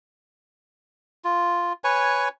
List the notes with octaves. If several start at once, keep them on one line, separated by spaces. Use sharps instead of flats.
F4
B4 C#5 G#5